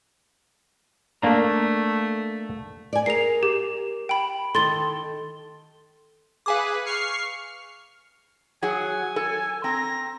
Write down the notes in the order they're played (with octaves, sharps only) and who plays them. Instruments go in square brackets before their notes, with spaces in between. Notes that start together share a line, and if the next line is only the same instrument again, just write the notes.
[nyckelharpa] A3 [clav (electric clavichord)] A#3 D4 A#5
[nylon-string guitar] D5 G#5
[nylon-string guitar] G#4 A#4 [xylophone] C7 F7
[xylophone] G4
G5 B5
[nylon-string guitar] D#3 A4 [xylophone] C6 A6 G7
[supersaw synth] G#4 B4 [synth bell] F5 G#5 D6
[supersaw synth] C#6 F6 C7
[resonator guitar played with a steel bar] F#3 G#4 F#5 [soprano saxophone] G#5
[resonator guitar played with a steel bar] A4
[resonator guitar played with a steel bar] C4 [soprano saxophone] A#5